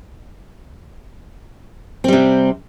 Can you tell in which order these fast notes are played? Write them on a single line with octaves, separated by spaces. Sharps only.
C4 G3 C3